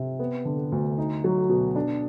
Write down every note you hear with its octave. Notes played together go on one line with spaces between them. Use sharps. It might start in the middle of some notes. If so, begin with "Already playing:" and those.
Already playing: C3
B3
D3
D2
D#4
F#3
B2
D4